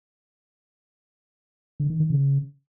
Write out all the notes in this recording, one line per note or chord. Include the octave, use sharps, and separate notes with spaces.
D3
D#3
D#3
C#3